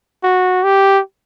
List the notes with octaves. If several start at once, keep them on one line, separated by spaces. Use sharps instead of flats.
F#4
G4